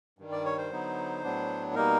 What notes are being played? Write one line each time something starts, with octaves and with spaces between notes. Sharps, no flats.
G2 D#3 G3
D5
C#5
C5
D3 F#3 B3 D#4
A2 F#3 B3 D4
B2 G3 A#3 D#4 A#4